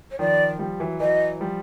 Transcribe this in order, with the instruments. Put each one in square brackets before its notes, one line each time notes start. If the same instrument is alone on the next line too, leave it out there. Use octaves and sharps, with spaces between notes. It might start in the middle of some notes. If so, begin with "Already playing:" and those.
[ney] C#5
[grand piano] D#3 F3 [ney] D5
[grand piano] F3 G3
E3 F#3
[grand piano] E3 F#3 [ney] D#5
[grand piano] F3 G3